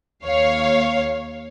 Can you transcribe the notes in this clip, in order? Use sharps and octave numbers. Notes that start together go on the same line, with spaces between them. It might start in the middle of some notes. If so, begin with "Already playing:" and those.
D#2 C#5 F5